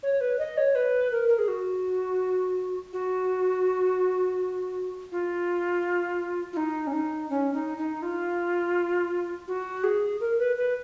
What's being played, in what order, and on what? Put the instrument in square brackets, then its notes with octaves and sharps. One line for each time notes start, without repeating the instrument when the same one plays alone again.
[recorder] C#5
B4
D#5
C#5
B4
A#4
A#4
G#4
F#4
F#4
F4
F4
D#4
C#4
D#4
C#4
D#4
D#4
F4
F#4
G#4
A#4
B4
B4